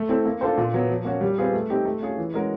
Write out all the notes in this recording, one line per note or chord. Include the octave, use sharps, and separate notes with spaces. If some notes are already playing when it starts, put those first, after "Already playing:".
Already playing: A3
C4 E4 A4
A#3
D4 F4 A4 C5
A#2
F#3 B3
F3
A#3 C#4 F#4
G3
C4 F4 G#4 B4
A3
C4 D#4 G4
A3
C#4 F4 G#4
E3
G#3 C#4 F#4 A#4